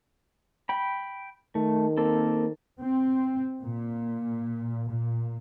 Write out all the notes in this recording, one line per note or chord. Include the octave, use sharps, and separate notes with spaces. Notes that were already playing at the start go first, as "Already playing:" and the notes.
G5 B5
D#3 A3
A#3 C4 A4
C4
A#2
A#2